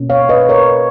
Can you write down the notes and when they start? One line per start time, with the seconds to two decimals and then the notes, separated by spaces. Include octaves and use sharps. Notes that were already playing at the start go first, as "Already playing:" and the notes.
Already playing: B2 A#3 C#4
0.10 C#5 F5
0.29 B4 D#5
0.49 A#4 C#5